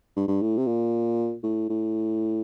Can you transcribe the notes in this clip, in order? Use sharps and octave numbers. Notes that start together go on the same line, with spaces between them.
G2
G2
A2
C3
A#2
A2
A2